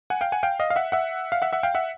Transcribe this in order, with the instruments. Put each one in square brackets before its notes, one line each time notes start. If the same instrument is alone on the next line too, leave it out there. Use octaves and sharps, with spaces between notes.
[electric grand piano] F#5 G#5
F5 G5
F#5 G#5
F5 G5
D#5 F5
F5
E5 F#5
E5 F#5
F5
E5 F#5
E5 F#5
F5 G5
E5 F#5